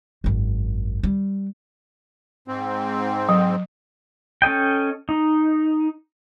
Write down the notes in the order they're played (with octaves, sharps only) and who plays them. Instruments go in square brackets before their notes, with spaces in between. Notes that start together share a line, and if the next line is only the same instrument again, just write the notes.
[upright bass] G#1 F#2
G3
[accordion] G#2 C4
[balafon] F#3
[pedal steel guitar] C#4 A4 D#5 G5
D#4